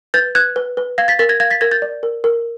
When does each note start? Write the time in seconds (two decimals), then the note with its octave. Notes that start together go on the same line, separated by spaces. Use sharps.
0.14 B4 G6 A6
0.35 B4 F#6 G#6
0.56 B4
0.77 B4
0.98 F5 G#6 A#6
1.08 A6 B6
1.19 A#4 A6 B6
1.29 G#6 A#6
1.40 F5 G#6 A#6
1.50 A6 B6
1.61 A#4 G#6 A#6
1.71 G6 A6
1.82 D5
2.03 A#4
2.24 A#4